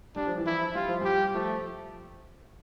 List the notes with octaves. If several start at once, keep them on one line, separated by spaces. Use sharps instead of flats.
G3 D4
F3
E3
F3 E4
G3 F4
F3
G3 G4
F3 A3